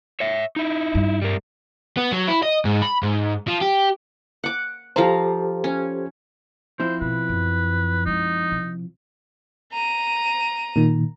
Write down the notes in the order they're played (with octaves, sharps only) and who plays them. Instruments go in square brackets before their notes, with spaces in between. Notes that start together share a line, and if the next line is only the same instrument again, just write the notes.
[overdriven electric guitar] C#5 E5
D#4 E4
[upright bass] G2
[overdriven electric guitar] G3 A#4
B3
F#3
E4
D#5
G#2
B5
G#2
F3
G4
[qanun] F#5 D6
[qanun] F3 F5 A#5 [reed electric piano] G4 A4 C5
[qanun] C#4
[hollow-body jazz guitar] F3 C4 E4 [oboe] C5
[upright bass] B2 [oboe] B4
[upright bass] F#2
[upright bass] F#2 G#3 [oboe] D#4
[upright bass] C3
[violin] A#5 D#7
[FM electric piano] A#2 D#3